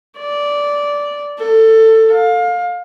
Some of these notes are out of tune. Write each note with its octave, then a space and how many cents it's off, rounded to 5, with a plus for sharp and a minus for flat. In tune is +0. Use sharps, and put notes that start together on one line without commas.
D5 -10
A4 +20
F5 +25